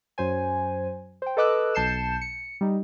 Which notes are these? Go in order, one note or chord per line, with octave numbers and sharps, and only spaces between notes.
F#2 F#3 C5 G#5
C5 G5
A4 B4 D#5 D6 E6 F#6
B1 A5 G6 C7 C#7 E7
C#7
G3 D#4